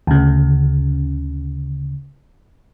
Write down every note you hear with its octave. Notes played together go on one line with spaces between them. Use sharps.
D2 C#3